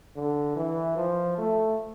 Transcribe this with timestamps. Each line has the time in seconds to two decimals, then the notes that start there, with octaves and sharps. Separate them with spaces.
0.16 D3
0.56 E3
0.97 F3
1.38 A3